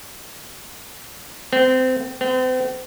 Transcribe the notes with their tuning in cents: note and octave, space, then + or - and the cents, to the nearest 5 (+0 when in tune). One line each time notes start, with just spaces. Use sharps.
C4 -25
C4 -40